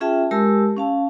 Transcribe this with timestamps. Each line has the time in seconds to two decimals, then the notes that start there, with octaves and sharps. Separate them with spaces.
0.01 C#4 F4 G#4 E5 G5 A5
0.31 G#3 G4 A#4 A5 E6
0.77 C#4 F5 A5